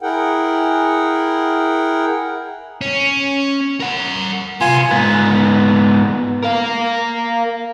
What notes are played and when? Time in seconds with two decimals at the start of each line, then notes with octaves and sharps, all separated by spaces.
0.02 E4 G#4 A#4 F#5 G5
2.81 C#4
3.80 A#4 F#5
4.61 C3 B3 F4 G#5 C6
4.91 G#2 B3
6.43 A#4 F5